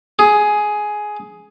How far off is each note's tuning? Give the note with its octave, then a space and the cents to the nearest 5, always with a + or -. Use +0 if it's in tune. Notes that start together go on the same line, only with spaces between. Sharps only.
G#4 +10